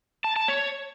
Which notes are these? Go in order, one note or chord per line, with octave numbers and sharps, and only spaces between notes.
A5
A5
C#5